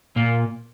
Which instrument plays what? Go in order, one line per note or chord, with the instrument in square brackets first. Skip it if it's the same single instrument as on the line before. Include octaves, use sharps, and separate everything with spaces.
[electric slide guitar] A#2 A#3